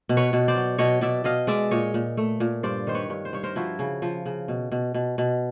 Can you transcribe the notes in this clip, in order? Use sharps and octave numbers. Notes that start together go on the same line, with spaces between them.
B2
B4 C#5
B2
C5 D5
F#3
B2 C#5 D#5
B2 D5 E5
B2 D#5 F5
G#3 D5 E5
A#2 C#5 D#5
A#2
A3
A#2
G2 C5 D5
D#3 C5
B4 C#5
G2
C5
G2 C#5
A#4 C5
F3 E4 F#4
C#3
F3
C#3
B2
B2
B2
B2